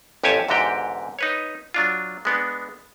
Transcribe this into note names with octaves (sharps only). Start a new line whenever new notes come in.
A1 F2 G4 C#5 G#5 A5
E2 G#2 D3 F#4 G4 G5
D#4 B4 C#5
F#3 D4 F4
G#3 B3 D4